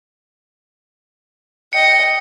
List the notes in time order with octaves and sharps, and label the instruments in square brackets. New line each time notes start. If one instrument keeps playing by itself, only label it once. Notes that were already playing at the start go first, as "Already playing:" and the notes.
[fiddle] D#5 G5 [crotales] C#7